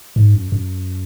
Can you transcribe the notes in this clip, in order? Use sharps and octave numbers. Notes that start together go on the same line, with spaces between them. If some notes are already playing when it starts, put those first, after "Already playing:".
G#2
F#2
F#2